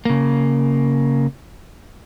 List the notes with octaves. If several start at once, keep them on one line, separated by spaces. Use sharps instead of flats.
C#3 A#3